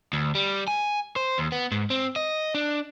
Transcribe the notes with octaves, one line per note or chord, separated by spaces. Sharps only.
D2
G3
G#5
C5
D#2
B3
G#2
C4
D#5
D4